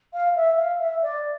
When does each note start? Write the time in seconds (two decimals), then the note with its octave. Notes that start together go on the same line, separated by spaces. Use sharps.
0.14 F5
0.36 E5
0.58 F5
0.80 E5
1.02 D5